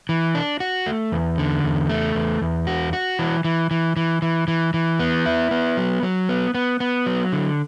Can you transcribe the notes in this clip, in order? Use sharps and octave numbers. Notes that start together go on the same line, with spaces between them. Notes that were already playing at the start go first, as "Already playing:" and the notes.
E3
D4
F#4
A3
E2
D3
E2
A3
E2
E2
F#4
F#4
E3
E3
E3
E3
E3
E3
E3
B3
E4
B3
F#3
F#3
B3
B3
B3
F#3
D3